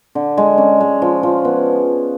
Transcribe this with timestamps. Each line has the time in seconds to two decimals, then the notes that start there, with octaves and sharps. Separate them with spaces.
0.15 D3
0.38 G#3
0.58 C#4
0.80 G#3
1.02 F3
1.23 F3
1.45 B3